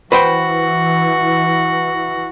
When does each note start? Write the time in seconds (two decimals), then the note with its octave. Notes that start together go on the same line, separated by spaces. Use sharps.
0.12 E3 F#4 B4 C5 G5